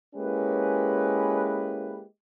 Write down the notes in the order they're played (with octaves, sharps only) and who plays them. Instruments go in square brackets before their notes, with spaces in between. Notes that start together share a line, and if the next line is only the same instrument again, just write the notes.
[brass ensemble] G#3 A#3 C#4 E4 G4 B4